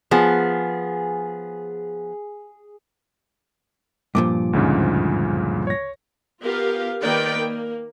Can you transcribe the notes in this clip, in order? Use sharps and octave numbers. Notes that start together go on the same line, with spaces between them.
F3 B3 G#4
G2 A#2 F3 D6
D2 G#2 C#3
C#5 A#6
B3 F4 G4 A#4 F5
D#3 A#3 A#4 B4 D5 G5
A#3